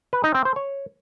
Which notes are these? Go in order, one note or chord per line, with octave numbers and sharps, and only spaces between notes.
B4
D#4
C4
C5
C#5